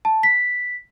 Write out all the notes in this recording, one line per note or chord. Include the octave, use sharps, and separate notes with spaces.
A5
B6